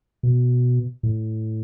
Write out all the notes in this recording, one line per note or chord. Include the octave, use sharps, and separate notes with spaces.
B2
A2